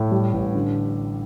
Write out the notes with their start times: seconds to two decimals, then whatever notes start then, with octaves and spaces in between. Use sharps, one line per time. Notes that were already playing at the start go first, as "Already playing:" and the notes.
Already playing: A2
0.11 G3
0.33 A1
0.55 D3